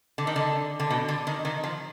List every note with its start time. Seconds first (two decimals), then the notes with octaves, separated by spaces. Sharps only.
0.18 D3
0.27 D#3
0.36 D3
0.80 D3
0.90 B2
1.08 D3
1.27 D#3
1.45 D#3
1.64 F3